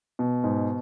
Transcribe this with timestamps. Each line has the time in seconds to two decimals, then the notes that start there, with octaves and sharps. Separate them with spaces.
0.19 B2
0.44 G#2